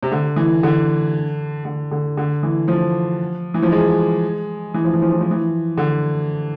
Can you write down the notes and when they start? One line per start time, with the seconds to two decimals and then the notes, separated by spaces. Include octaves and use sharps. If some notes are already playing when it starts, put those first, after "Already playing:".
0.03 C3
0.12 D3
0.36 E3
0.63 D3
1.65 D3
1.91 D3
2.17 D3
2.43 E3
2.68 F3
3.54 E3
3.62 F3
3.72 G#3
4.74 E3
4.84 F3
4.94 E3
5.02 F3
5.13 E3
5.21 F3
5.31 E3
5.78 D3